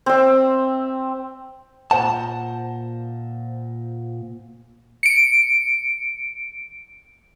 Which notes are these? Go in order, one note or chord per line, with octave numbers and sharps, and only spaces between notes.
C4 E5
A#2 C5 F#5 A5
C#7 D7